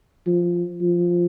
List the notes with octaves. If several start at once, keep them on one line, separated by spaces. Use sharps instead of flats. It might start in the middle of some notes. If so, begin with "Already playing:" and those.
F3
F3